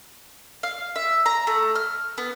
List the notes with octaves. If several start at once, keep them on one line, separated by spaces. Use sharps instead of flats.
F5
E5
A#5
A3
F6
B3